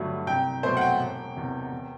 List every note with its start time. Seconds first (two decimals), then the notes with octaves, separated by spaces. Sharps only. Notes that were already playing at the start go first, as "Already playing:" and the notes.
Already playing: G1 G2 D3 F#3 A3
0.26 C2 G5
0.63 B2 F#3 A3 C5
0.77 F#5
0.81 G5
0.99 E1
1.36 E2 C3
1.71 E2